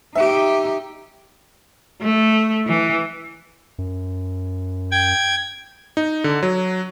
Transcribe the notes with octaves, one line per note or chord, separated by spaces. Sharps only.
D#4 G4 E5
A3
E3
F#2
G5 G#6
D#4
D3
F#3